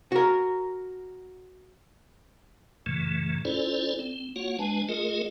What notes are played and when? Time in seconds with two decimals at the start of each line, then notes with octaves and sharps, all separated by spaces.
0.12 F#4 A#4
2.86 F#2 A#2 C#3 E3 A3
3.45 C#4 E4 F4 A4 C5 D5
3.99 C4
4.36 A#3 F4 F#4 C#5 F#5
4.59 G#3 D4 B4 G#5 A5
4.89 A3 F4 G#4 A#4 D#5